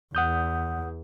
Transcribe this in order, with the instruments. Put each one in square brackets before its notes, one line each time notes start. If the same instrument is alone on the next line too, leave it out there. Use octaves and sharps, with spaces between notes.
[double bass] E2 [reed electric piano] F#5 D#6 G6